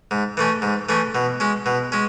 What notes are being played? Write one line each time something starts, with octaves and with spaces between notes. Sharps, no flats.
G#2
E3 A3 C#4
G#2
E3 A3 C#4
B2
G#3 C#4
B2
G#3 C#4